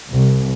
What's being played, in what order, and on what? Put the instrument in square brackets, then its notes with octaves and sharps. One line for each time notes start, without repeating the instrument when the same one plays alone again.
[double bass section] C2